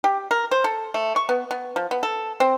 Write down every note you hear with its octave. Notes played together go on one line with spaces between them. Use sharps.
G4
A#4
C5
A4
A3
C#6
B3
B3
F3
B3
A4
C4